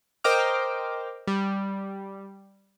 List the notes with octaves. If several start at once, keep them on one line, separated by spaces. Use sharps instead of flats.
A#4 C5 D#5 G5 D6 F6
G3